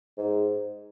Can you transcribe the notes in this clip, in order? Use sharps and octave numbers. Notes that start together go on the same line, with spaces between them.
G#2